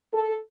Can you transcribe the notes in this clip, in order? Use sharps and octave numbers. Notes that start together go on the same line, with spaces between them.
A4